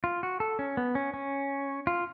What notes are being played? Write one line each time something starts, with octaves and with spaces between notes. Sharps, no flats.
F4
F#4
A4
C#4
B3
C#4
C#4
F4